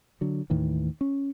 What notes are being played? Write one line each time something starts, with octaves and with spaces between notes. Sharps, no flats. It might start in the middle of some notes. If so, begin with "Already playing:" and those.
D3 F#3
D#2 A2 D#3 E3
C#4